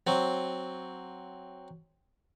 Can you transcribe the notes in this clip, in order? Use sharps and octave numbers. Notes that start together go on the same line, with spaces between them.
F#3 C4